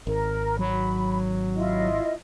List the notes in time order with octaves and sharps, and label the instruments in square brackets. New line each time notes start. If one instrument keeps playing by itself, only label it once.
[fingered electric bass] G#1 [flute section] A#4
[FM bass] F#3 [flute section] B5
[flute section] E4 F4 D#5